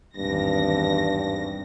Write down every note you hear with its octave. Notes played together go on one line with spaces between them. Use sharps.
G#1 E2 G2 A#6